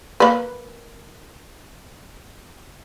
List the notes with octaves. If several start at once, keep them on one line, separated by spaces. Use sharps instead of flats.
A#3 B4